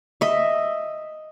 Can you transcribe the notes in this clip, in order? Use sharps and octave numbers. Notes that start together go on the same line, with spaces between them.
D#5 E5